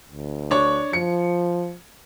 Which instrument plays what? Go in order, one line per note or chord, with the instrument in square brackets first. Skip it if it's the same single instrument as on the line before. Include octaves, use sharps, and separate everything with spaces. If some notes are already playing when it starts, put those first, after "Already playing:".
[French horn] D2
[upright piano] D4 C#5 C#6
[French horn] F3 [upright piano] C#7